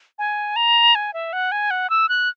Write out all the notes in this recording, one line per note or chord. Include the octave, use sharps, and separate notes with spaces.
G#5
A#5
G#5
E5
F#5
G#5
F#5
E6
F#6